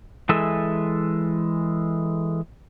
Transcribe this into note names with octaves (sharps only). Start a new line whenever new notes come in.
E3 G#3 A4 E5 G#5